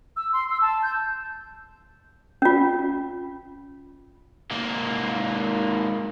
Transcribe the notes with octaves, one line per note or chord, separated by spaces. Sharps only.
E6
C6
E6
A5
G6
C#4 F4
G#2 A#3